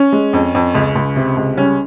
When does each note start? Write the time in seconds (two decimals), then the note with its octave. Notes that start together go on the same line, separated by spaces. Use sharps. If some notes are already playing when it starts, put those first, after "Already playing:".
Already playing: C#4
0.12 G#3
0.33 F2
0.55 F2
0.75 C#2
0.95 C#2
1.16 C3
1.37 C#2
1.57 G3 C#4